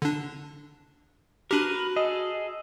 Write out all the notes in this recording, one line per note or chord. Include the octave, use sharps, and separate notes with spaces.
D3 D4
D4 F#4 G4 A#4 B4
G#4 A4 D#5